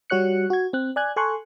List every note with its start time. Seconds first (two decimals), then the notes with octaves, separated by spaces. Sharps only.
0.10 G3 F#4 C#5 F#6 C#7
0.50 F#4 G#6
0.73 C4 F#6
0.96 D5 G#5 F#6 G#6
1.16 A4 G#5 C6 C#6 F#6